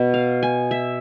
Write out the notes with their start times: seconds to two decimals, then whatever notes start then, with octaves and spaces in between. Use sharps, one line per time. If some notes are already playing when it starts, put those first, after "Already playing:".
Already playing: B2 B3
0.14 F5
0.43 G#5
0.71 E5